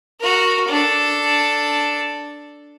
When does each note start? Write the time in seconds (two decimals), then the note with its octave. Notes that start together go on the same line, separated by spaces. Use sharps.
0.20 F#4 A#4
0.68 D4 A4